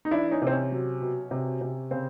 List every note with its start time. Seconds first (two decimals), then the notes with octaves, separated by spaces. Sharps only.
0.05 D#4
0.11 E3 D4 E4
0.31 C#4 D#4
0.42 C3
0.47 C4
0.52 C#4
0.71 F#3
1.01 B2
1.31 C3
1.61 C3
1.91 C#3 C4